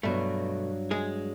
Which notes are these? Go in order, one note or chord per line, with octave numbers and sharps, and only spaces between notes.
G2 B2 F#3 A3
G#3 G#4